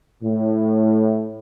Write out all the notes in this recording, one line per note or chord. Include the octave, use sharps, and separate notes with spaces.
A2